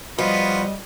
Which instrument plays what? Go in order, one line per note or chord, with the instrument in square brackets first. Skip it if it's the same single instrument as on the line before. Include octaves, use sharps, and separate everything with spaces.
[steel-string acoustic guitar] F3 [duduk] G3 [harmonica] B3 F4 F#4 [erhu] D#5